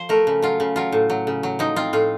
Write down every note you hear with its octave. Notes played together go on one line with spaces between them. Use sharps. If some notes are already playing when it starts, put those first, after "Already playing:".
Already playing: F3 C5
A3 A#4
C#3
F#3 F4
C#3
F#3 F4
A2
F#3
C#3
F#3
F3 D#4
C4 F4
A2 F4